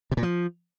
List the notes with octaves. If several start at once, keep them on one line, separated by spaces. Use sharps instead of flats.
C3
A#2
F3